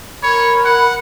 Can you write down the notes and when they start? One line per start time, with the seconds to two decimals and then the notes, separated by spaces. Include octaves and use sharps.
0.23 A#4 C#5 B5
0.65 F#5